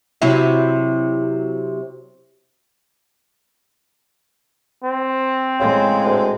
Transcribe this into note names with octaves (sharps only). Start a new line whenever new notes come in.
C3 F#3 E4
C4
A2 C#3 G#3
D2